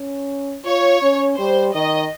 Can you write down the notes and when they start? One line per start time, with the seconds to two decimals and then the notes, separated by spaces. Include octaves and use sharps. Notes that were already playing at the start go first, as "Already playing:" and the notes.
Already playing: C#4
0.65 F4 C#5
1.02 C#4
1.38 G3 C5
1.74 D#3 D#5